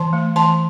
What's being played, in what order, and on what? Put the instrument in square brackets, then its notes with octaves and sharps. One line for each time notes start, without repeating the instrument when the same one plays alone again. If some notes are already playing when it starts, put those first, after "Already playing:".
Already playing: [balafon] E3 A5 C6
A3
E3 A5 C6